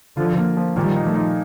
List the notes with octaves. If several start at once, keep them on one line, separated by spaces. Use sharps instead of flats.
D3 F3 F4
A#3
F3
A#2 D#3 G3
D#4
F3 A3
D#4